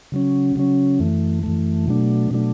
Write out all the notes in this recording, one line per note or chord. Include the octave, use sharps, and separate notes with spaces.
C#3 F#3 C#4
C#3 F#3 C#4
F#2 E3 A3
F#2 E3 A3
B2 F#3 A3 D4
B2 F#3 A3 D4